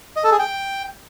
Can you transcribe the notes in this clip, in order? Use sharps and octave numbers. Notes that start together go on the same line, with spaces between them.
D#5
A4
G#4
G5